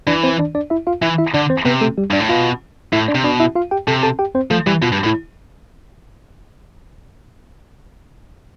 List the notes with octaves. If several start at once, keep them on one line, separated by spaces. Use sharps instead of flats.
E3 D4 D5
C4 C5
D4 D5
D4 D5
E4 E5
F4 F5
E3 E4 E5
E4 E5
D3 D4 D5
C4 C5
C3 B3 B4
A3 A4
G3 G4
G2 D4 D5
A2
B2 F4 F5
A2 E4 E5
D4 D5
C3
B2 D4 D5
E4 E5
F4 F5
G4 G5
C3 A4 A5
A4 A5
G4 G5
C4 C5
F3 A3 A4
E3 G3 G4
B2 F4
G2
A2 E4